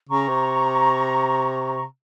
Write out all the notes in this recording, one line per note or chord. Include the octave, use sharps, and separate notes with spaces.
C#3 A#5 C#6
C3